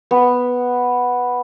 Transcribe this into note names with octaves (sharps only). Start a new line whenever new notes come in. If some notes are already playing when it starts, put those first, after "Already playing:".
B3